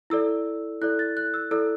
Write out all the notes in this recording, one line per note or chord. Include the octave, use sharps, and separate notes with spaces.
E4 A4 D5 E6
E4 A4 D5 F#6
A6
F#6
E6
E4 A4 D5 E6